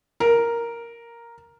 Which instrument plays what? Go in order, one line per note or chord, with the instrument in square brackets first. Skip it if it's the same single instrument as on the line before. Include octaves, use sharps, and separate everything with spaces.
[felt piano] A#4